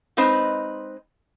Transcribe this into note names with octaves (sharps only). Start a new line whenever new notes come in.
G#3 C4 D#4 B4 C5 D#5